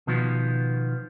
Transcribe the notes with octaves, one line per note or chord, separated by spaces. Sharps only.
B2 D#3 F3 B3